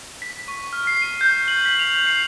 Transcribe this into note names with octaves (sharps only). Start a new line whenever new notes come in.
B6
C#6
F6
C7
D#7
G6
F#7
B6
F7
C7